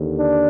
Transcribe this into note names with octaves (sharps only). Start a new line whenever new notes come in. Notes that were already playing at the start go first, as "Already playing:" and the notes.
Already playing: D#2 D3
D4